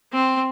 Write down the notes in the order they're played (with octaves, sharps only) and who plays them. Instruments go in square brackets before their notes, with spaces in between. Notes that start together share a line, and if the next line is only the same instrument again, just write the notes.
[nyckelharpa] C4